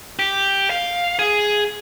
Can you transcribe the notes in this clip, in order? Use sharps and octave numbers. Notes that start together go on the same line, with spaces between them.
G4
F5
G#4